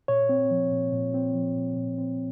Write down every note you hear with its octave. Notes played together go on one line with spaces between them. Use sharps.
A#2 C#5
C4
F3
A#2
A#2
C4
F3
A#2
A#2
C4